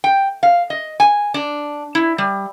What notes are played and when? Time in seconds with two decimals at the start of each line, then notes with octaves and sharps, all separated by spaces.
0.04 G5
0.43 F5
0.70 D#5
1.00 G#5
1.34 D4
1.95 E4
2.18 G3